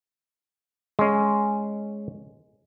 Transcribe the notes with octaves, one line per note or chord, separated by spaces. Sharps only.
G#3 C#4